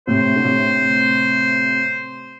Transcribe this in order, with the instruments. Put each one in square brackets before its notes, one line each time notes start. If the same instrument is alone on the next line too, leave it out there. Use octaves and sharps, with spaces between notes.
[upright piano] A2 C3 [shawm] C5
[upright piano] D3
A2 C3